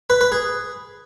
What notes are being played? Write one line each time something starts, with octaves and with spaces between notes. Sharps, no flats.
B4
B4
G#4